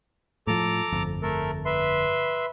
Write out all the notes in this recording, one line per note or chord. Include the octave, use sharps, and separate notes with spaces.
A2 F3 A4 A#5 D6
G1 F2
A3 A4 A#4
B4 E5 C6